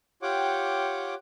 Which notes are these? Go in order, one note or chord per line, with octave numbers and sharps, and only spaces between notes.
F4 G4 C#5 F#5 G5 D6